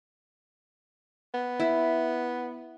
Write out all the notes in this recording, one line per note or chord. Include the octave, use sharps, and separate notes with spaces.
B3
E4